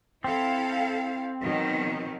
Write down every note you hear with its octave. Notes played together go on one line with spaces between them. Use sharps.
C4 E4 A4 F5
B2 D#3 F#3